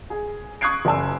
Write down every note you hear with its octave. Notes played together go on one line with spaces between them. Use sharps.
G#4
C#6 D#6 F#6 G#6 C7 D7
F#1 D5 G#5 E6